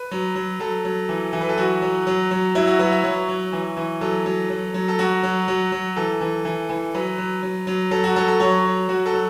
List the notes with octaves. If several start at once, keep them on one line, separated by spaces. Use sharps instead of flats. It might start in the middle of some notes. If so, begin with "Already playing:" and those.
Already playing: B4
F#3
F#3
F#3 A4
F#3
E3
E3
B4
A4
F#3 F#4
F#3
F#3
F#3
F#3 E4
F#4
F#3 B4
E5
F#3 C#5
F#3
E3
E3
F#3 A4
F#3
F#3
F#3
A4
F#3 F#4
F#3
F#3
F#3
E3 A4
E3
E3
E3
F#3 B4
F#3
F#3
F#3
F#3 A4
F#4
F#3 A4
A4
F#3 C#5
F#3
F#3 F#4
A4
F#3